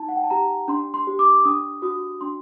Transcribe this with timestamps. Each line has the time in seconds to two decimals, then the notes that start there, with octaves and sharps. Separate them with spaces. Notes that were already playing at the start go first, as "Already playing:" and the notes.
Already playing: D#4 A5
0.09 F#5
0.16 G5
0.24 A5
0.30 G4 A#5
0.68 D4 C6
0.94 C6
1.07 G4
1.19 D6
1.45 D4 D#6
1.82 F#4 D#6
2.21 D4 C6